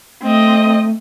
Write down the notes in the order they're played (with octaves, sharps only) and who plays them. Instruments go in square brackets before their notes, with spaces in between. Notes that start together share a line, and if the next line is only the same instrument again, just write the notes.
[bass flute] A3 [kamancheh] C4 D#5